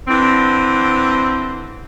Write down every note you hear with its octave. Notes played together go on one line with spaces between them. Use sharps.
D3 E3 C4